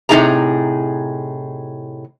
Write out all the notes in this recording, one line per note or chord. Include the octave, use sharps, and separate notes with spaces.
A2 C3 G#3 D#4 G#4 A#5